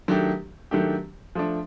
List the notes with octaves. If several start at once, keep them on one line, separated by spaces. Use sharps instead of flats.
D#3 F#3 A3 D4 G4
D#3 F#3 A3 D4 G4
F3 A3 D4